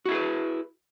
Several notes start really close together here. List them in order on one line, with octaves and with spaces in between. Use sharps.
F#4 E4 G#4 B4